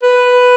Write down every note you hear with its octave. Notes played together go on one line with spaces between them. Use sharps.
B4